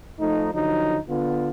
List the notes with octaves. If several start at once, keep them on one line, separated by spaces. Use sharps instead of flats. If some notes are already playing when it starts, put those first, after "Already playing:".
F3 A3 D#4
D3 F3 F#3 D#4
D3 B3 F4